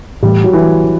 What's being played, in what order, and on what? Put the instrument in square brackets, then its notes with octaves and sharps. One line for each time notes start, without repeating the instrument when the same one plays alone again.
[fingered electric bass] A2 E3 A3 [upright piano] G3
[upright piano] F#3
E3
[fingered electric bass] E3